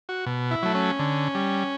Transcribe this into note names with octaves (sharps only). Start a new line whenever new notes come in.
F#4
B2
E4
F#3 A3
C#4
D3
G3